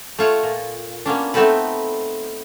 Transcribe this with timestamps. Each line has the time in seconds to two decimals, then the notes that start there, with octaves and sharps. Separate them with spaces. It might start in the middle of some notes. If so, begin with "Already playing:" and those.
0.19 A3 F4 C#5 F#5
0.43 A#2
1.06 A#3 B3 C#4 D4
1.34 A3 B3 C4 D#4 A4 B4